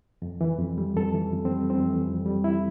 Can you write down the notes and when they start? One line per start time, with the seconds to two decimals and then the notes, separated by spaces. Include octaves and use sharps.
0.22 F2
0.41 E3
0.59 F2
0.78 G3
0.96 F2 A4
1.14 E3
1.33 F2
1.45 C4
1.52 G3
1.70 F2 C4
1.89 E3
2.08 F2
2.26 G3
2.44 E4